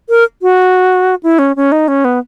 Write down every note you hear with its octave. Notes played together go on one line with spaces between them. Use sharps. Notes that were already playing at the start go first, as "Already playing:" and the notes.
A#4
F#4
E4
C#4
C#4
D#4
C#4
B3